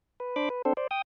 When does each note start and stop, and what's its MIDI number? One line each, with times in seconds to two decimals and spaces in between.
0.20 0.36 71
0.36 0.49 62
0.36 0.49 72
0.36 0.49 83
0.36 0.49 86
0.50 0.62 71
0.65 0.73 60
0.65 0.73 62
0.65 0.73 69
0.65 0.73 72
0.77 0.87 72
0.77 0.87 74
0.91 1.02 79
0.91 1.02 87